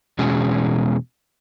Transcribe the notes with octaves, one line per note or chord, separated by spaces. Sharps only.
E2 B2 G#3 C#4 G#4